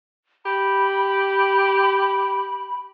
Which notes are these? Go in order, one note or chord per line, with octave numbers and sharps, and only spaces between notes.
G4 B5